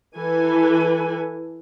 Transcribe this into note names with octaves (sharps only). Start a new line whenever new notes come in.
E3 A4 B4 G#5